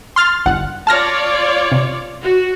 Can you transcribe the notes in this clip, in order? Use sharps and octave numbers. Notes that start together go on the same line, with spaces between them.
C6 F6 A6
G1 F#5
F4 C#5 D5 A5 F6 A#6
C3
F#4